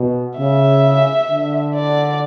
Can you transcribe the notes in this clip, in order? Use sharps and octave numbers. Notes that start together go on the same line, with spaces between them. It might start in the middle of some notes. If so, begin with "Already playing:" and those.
Already playing: B2
C#3 E5
D3
D5